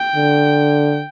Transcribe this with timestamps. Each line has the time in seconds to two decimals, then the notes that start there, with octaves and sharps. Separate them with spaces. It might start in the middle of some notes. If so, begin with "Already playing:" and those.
Already playing: G5
0.15 D3